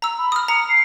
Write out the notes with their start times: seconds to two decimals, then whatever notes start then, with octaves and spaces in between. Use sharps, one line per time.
0.02 A#5 E6
0.18 B5
0.32 D#6 F6
0.48 A#5 C#7
0.69 C7